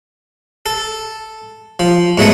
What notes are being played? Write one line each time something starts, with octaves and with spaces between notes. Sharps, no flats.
A4
F3
G#2 F#3 A3 B3